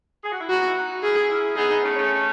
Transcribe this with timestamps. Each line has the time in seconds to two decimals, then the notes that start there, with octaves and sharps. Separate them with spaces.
0.24 G#4
0.32 F#4
0.40 E4
0.49 B3 D#4 F#4
0.67 E4
0.76 D#4 F#4
1.02 C#4 E4 G#4
1.30 C#4 E4
1.55 B3 D#4 G#4
1.69 B3 D#4
1.83 A3 C#4
1.96 A3 C#4